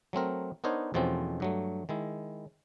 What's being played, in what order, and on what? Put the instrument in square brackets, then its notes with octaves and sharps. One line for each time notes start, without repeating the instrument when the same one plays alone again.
[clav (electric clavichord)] F#3 A3 C4 A#4
B3 D4 D#4 A#4 C5 C#5
E2 B2 F3 A3 C4 C#4
G2 F#3 A3
D#3 G#3 E4